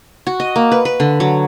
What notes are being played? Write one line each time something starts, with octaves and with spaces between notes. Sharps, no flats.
F#4
D#5
A#3
B4
B4
D3
F#3